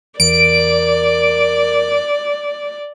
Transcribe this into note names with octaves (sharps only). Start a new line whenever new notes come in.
E2 A#4 D5 D7